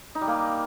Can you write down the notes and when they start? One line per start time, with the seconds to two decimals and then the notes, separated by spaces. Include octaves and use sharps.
0.15 D#4
0.21 G3
0.27 A#3